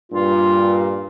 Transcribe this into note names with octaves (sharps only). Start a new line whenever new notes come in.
G2 A#2 F4